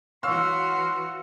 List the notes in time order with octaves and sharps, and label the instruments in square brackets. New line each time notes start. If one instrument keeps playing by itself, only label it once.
[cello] E3 F#4 [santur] C#5 F5 [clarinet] C6 [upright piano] E6